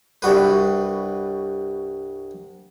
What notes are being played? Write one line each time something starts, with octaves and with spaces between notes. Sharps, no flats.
C2 G2 F#4 B4